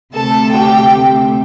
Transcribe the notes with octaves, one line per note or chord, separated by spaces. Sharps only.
D2 C3 A3 C4 A4 A5
G4 G5